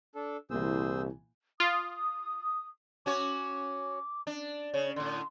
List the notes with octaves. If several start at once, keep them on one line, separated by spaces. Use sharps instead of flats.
D4 A4
C2 A#2 E3 G#4 C5 E6
F4 D#6
C#4 F#4 C#5 D6
D4
C#3 C#5
A2 D3 C6